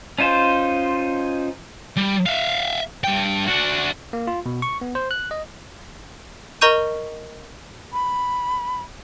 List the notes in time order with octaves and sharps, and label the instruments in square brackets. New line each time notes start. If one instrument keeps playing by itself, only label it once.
[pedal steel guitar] C#4 D#4 F4 C5
[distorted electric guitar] G3
E5 F5
G2 G5
D4 F#4
[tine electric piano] A#3
F4
B2
C#6
B3
C5
F#6
D#5
[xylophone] A#4 D#5 A#5 C#6 G6 D#7
[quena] B5